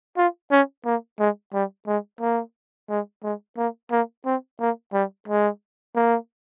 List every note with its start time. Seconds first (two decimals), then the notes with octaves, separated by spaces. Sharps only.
0.17 F4
0.51 C#4
0.85 A#3
1.19 G#3
1.53 G3
1.87 G#3
2.21 A#3
2.90 G#3
3.23 G#3
3.57 A#3
3.91 A#3
4.25 C4
4.60 A#3
4.93 G3
5.28 G#3
5.96 A#3